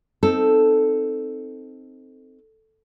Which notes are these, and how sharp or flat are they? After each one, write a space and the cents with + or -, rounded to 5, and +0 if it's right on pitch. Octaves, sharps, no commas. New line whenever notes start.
C4 +0 D#4 +0 A4 +0